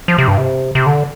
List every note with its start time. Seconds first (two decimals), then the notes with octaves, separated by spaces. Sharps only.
0.08 F3
0.18 C3
0.28 G2
0.38 C3
0.75 C3
0.86 D3